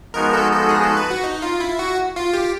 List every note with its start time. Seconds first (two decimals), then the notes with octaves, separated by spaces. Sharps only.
0.14 F3 G#3 B3 D#4 F#4 A#4
0.33 A4
0.52 A4
0.69 G#4
0.83 A4
0.97 B4
1.10 F#4
1.24 D#4
1.42 F4
1.60 E4
1.79 F#4
2.16 F4
2.33 G4